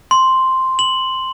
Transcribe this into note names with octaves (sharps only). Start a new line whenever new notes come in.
C6
F#7